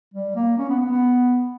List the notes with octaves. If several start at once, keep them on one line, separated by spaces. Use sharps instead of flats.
G3
A#3
C#4
B3
B3
B3